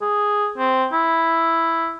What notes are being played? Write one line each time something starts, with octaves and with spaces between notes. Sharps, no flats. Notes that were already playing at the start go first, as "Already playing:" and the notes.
G#4
C4
E4